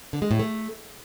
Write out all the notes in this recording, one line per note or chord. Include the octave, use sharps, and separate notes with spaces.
D3
G#3
A2
A3